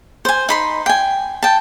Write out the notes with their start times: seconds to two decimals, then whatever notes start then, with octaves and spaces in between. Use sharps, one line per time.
0.25 C5 G#5
0.49 D#4 B5 C6
0.86 G5 G#5
1.43 G5 A5